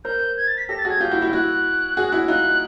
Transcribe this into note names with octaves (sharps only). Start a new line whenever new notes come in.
A#4 C5 G6
G#6
A6
B6
G4 A4 A#6
A6
F#4 G#4
G#6
F4 G4 G6
E4 F#4
E4 F#4
E4 F#4 F#6
F#4 G#4
E4 F#4
D#4 F4 F#6